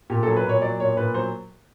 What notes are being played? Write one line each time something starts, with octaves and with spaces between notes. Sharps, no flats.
A#2 G4
F#3 A4
B4
A#2 C#5
F#3 D5
A#2 C#5
A#2 B4
F#3 C5